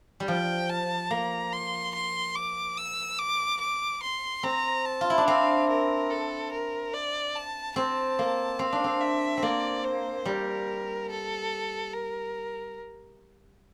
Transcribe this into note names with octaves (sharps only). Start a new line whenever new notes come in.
G3
F3 G5
A5
A#3 A#5
C6
C6
D6
E6
D6
D6
C6
C4 A#5
A5
F4
E4
D4
C4 F5
A#4
A4
A#4
D5
A5
C4 A5
A#3
C4 F5
D4
C4
E5
C4
A#3 D5
C5
G3 A#4
A4
A#4